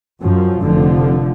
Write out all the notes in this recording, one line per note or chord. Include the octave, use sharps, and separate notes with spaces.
F#2 F3
F1 D3 F3